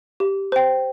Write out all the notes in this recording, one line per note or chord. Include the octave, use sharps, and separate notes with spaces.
G4
C5 G5